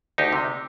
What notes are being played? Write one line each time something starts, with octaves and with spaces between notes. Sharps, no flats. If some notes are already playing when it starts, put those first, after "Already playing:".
D2 D#4 G4
C3